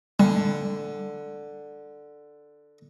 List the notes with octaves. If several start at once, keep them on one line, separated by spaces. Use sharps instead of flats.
D3 G3